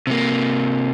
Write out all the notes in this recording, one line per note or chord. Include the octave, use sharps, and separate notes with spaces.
C3 A#3